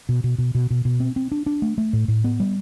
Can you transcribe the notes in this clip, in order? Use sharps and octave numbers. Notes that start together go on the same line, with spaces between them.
B2
B2
B2
B2
B2
B2
C4
C4
D4
D4
A3
A3
A2
A2
B3
G3